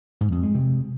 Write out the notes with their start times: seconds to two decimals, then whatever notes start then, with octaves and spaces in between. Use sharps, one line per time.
0.21 G#2
0.32 F2
0.43 G#3
0.55 C3